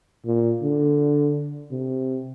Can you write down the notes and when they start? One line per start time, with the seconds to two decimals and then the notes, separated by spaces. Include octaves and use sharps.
0.26 A#2
0.62 D3
1.71 C3